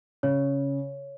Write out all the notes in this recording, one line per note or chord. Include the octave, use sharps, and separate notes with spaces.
C#3 C#5